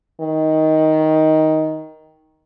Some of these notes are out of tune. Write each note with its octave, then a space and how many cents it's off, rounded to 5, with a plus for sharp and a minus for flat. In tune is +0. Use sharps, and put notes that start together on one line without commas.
D#3 +10